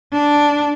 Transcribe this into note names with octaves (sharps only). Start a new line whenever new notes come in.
D4